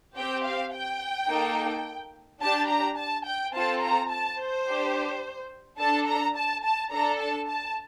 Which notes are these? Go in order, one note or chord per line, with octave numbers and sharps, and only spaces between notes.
C4 G4 G5
F5
G5
A#3 D#4 A4
D4 G4 A5
A#5
A5
G5
C4 F4 A4 A5
A#5
A5
C5
D4 G4
D4 A4 A5
A#5
A5
A5
D4 A4 A#5
A5
A5